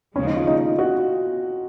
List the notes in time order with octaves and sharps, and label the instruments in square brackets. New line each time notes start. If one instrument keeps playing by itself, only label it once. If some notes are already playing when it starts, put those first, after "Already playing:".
[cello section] D#2 C#3 F3 G#3 [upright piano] C#4
[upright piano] D#4
F4
D#4
D#4
F#4